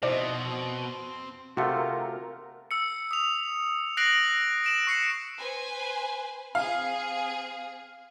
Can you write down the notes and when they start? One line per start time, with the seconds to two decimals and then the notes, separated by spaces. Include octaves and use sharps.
0.03 B2 C4 D#4 E4 C5 D5 F5
1.57 C3 A3 F4 F#4 A#4 F#5
2.71 E6 C#7
3.11 D#6 F7
3.97 F#6 A#6 C7 D7 F#7
4.64 D7 E7 F#7
4.87 C#6 C7 C#7
5.39 B4 C5 G#5
6.55 C4 G#4 F5